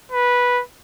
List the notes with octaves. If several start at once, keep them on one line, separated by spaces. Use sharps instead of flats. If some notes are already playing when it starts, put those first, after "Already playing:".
B4